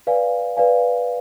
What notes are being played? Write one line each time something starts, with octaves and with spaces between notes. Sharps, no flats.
B4 D5 F5 G#5
B4 D5 F5 G#5